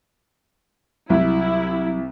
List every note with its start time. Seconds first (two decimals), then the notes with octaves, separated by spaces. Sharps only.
1.10 C2 F#3 E4